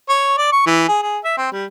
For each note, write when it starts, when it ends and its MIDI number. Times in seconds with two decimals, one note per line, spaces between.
0.09 0.35 73
0.38 0.51 74
0.52 0.62 85
0.66 0.84 52
0.88 1.00 68
1.02 1.18 68
1.25 1.33 76
1.37 1.50 60
1.52 1.65 55